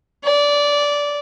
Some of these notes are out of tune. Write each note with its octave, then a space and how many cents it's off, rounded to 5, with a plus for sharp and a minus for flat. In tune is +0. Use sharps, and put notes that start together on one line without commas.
D5 -15